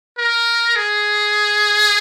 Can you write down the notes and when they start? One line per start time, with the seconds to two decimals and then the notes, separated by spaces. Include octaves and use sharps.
0.18 A#4
0.76 G#4